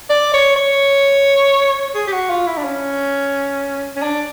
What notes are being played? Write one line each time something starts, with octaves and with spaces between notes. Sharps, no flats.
D5
C#5
C#5
G#4
G4
F#4
F4
E4
D4
C#4
C#4
D4